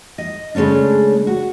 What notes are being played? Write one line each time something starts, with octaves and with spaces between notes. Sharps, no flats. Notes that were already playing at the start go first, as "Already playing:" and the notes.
D#5
C#3 G#3 A3 C#4 D4
F#4